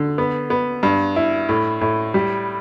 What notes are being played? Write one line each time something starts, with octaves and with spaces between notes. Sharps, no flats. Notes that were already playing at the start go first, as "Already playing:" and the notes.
Already playing: D3
B3
B3
G2
E4
A2
A2
G3